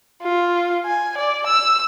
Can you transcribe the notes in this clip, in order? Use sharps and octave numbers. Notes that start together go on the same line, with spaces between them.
F4
G#5
D5
E6